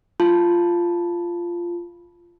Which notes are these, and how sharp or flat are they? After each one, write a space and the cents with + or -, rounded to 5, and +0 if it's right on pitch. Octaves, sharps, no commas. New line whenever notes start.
F4 -10 A5 +0